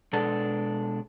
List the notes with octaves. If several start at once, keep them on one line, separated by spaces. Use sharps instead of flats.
B2 G#3 D4 A4